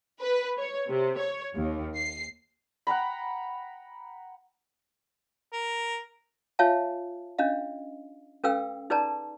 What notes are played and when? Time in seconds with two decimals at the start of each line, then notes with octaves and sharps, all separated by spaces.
0.20 B4
0.58 C#5
0.88 C3
1.18 C#5
1.56 D#2
1.96 C7
2.87 F#5 G5 A#5 B5
5.53 A#4
6.59 F4 C#5 E5 F5 G#5 A5
7.39 C#4 D4 D#5 F5
8.44 C#4 A4 B4 F5 G5 E6
8.90 D#4 G#4 B4 D5 A5 A#5